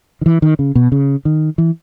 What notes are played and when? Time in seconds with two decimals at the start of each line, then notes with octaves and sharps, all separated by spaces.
0.21 D#3
0.26 E3
0.42 D#3
0.59 C#3
0.75 B2
0.92 C#3
1.25 D#3
1.58 E3